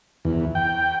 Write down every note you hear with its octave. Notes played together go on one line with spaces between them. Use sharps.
E2
G5